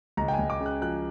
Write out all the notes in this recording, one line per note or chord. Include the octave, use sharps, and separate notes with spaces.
C#2 A#5
G5
G#5
C#2
D6
C#3
F#6
F3 F#6